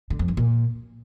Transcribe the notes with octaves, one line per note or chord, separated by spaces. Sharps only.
D3
F2
G2
A#2